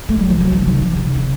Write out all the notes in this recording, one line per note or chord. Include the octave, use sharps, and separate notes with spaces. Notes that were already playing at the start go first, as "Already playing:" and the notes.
A3
F#3
F3
F#3
F3
C#3
D#3
F3
C#3
D#3
C#3